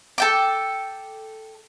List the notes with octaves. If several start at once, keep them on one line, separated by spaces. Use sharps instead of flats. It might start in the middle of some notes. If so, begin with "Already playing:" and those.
A4 G5 D6